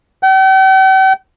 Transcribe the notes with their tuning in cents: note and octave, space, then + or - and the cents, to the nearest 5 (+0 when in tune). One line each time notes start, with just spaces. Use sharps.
G5 -45